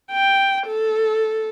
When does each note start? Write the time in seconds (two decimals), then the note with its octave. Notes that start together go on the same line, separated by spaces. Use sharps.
0.12 G5
0.67 A4